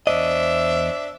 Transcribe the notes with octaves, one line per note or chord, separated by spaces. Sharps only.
E2 G#2 D4 C5 D#5 E5